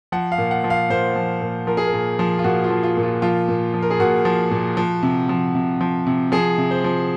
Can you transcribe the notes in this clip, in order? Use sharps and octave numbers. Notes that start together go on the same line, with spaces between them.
F3 F#5
F5
A#2
F#5
F3
F5
A#2 C5
F3
A#2
F3 A#4
G#4
A#4
A#2
F3
F4
A#2 F#4
F4
F3
F4
A#2
F4
F3 F4
A#2
F3
A#4
G#4
A#2 F#4
F3
A#2
F3
C3
F3
C3
F3
C3
F3 G#4
C3
C5
F3